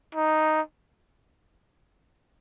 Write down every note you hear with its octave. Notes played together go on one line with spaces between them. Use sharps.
D#4